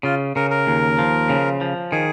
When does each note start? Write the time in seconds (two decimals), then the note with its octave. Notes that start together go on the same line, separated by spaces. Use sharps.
0.03 C#3 F4
0.36 C#3 A#4
0.50 A#4
0.67 D#2
0.99 F3
1.30 C#3
1.61 F3
1.92 D#3 G#4